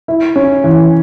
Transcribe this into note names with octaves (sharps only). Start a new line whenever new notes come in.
E4
C#4
E3